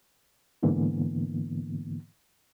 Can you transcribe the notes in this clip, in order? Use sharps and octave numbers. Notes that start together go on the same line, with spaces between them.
G#2 D3 E3 A#3 B3